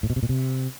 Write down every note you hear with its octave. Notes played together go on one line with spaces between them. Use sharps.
A2
B2
C3
A#2
C3